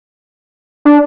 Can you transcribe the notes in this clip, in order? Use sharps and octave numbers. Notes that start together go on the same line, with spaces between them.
D4